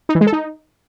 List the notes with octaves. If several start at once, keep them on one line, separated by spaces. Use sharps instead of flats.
D#4
E3
G#3
A4
D#4